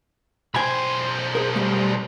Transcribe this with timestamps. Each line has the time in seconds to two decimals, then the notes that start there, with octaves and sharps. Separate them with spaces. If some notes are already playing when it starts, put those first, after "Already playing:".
0.55 B1 C5 G5 G#5 B5
1.35 G#4 A#4
1.56 G3 A3